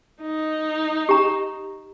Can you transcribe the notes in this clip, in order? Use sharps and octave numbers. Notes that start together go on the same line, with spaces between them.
D#4
G4 A#5